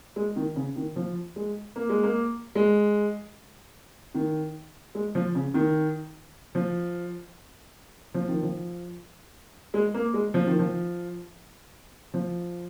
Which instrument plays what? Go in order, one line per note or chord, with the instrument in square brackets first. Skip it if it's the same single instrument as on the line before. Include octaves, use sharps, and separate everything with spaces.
[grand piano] G#3
D#3
C#3
D#3
F3
G#3
A#3
G#3
A#3
G#3
D#3
G#3
F3
C#3
D#3
F3
F3
D#3
F3
G#3
A#3
G#3
F3
D#3
F3
F3